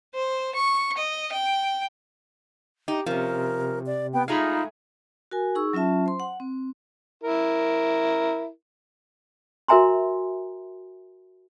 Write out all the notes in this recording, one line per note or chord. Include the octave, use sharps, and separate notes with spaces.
C5
C#6
D#5
G5
D#4 G4
C3 F3 C#4 A#4
D5
B3 G5
G#3 A3 D#4 F4 G#4 F5 A#5 B5
F#4 A#4 G#5
D#4 G#4 C#6 E6
F#3 C#4 F4 E5 A5
C5 C6
F#5
C4
E4 A#4
F#4 A#4 E5 G#5 A#5 C6